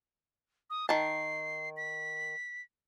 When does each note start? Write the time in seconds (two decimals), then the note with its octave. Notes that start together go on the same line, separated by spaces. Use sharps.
0.70 D#6
0.89 D#3 A5 C7
1.77 B6